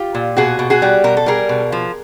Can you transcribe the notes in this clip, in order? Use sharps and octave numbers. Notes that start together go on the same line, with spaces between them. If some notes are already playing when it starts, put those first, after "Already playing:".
Already playing: F4 G4
A#2
B2 F#4 G#4
B2
F#4 G#4
G3
B2 A#4
A4
G3 G#4 A#4
B2
F3